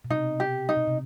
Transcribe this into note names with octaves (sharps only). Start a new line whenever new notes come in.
B2
C3 D#4
G4
D#4
B2
C3